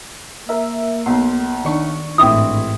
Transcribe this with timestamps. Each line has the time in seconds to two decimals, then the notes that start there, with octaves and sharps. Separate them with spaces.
0.49 A#3 A#4 E5
1.06 B1 C6
1.65 D#3 D4 C#6
2.18 A1 G#2 C4 E4 D#6